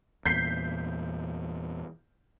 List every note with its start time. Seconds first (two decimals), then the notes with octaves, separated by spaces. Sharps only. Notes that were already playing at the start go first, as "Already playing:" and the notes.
0.25 E2 A#2 G6 B6 C7